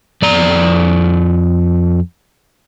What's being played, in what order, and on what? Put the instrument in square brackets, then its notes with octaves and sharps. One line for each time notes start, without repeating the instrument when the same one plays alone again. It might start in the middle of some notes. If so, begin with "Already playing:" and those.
[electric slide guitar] F2 D5 A#5